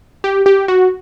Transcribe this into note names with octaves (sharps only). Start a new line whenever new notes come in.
G4
G4
F#4